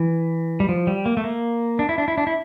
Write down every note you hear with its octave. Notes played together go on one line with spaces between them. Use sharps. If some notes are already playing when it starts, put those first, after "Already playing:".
Already playing: E3
G3
F3
G3
A#3
A3
A#3
D4
E4
D4
E4
D4
E4